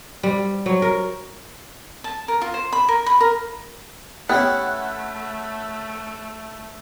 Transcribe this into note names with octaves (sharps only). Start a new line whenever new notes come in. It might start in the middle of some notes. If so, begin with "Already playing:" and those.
G3
F#3
A#4
A5
A#4
F4
C5
B5
A#4
B5
A#4
A3 B3 C#4 E4 G4 F#5 G5